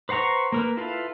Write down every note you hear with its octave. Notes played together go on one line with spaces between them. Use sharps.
B4 C5 F#5 A#5 C#6
A#3 A#4 B4
E4 F4 A4 B4 F5